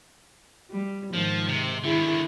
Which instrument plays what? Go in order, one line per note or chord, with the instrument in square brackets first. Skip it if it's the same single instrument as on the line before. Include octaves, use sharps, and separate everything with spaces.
[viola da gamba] G3
[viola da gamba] G#2 D#3 [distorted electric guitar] F3
[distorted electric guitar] C3
[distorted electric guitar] D3 D#3 [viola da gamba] E4 G#4